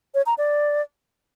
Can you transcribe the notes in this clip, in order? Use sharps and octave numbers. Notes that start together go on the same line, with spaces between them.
C#5
A#5
D5